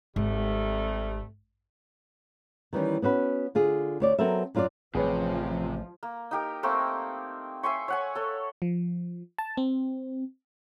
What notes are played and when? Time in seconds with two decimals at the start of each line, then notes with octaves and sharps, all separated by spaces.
0.16 G#1 C3 G3 A3
2.73 D#3 E3 G3 C#4
3.02 B3 C#4 F#4 B4
3.55 D3 F4 G#4
4.00 D2 C#5 D5
4.19 F#3 B3 C4 A4 A#4 E5
4.55 F#2 F#3 F4 B4 D5
4.95 A1 C3 F3 G#4 B4 C#5
6.03 A#3
6.31 D#4 G4 A#4
6.63 A3 A#3 C4 C#6
7.63 E5 G#5 C6 C#6
7.88 C#5 F#5 G#5
8.15 A4 C#5
8.62 F3
9.38 A5
9.57 C4